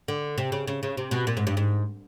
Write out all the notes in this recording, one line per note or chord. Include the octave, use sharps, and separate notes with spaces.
D3
C3
C#3
C#3
C#3
C3
B2
A#2
G#2
G2
G#2